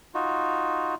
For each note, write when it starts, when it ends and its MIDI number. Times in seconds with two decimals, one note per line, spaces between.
0.14 0.95 63
0.14 0.95 65
0.14 0.95 66